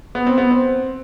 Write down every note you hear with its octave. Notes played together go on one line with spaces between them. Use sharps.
B3
C4
B3
C4